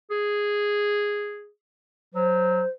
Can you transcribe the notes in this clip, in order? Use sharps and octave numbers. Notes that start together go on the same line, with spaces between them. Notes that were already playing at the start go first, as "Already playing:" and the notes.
G#4
F#3 C5